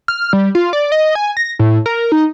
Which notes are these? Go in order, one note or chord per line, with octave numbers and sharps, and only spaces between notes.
F6
G3
F4
D5
D#5
G#5
A#6
A2
A#4
D#4